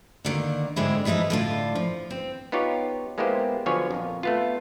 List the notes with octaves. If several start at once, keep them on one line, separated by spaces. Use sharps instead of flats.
D3 D#3 A#3
E2 G#2 D3 G#3 C4 E4
E3 F3 G#3 D#4 E4
A2 D3 F4
F3
C4
B3 D#4 F4 G4 C#5
G#3 A#3 B3 E4 G4 C5
D3 F3 F#3 B3 C#5 G#5
F2 A#2
A3 B3 F4